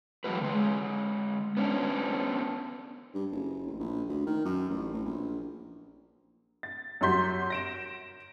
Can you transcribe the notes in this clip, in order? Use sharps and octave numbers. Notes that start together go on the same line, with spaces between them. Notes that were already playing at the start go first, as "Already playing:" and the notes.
E3 F#3 G#3 D#4 F#4 B4
D3 G#3
B3 C#4 D4
G2
F#1
A1
A#1
D2
D#3
F#2
A1
A1
A#1
A6
F#2 G3 F#4 C6 G6 B6
A#6 D7 E7